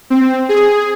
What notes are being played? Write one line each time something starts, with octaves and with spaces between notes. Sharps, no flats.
C4
G#4